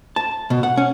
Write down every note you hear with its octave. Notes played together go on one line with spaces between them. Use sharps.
A5
B2
F#5
C#4